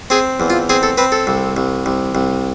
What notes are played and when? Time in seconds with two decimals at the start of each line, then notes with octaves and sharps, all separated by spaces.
0.10 C4 G#4
0.40 E2
0.50 F4
0.69 C4 G#4
0.83 A4
0.98 C4 B4
1.12 A4
1.27 C2
1.57 C2
1.86 C2
2.15 C2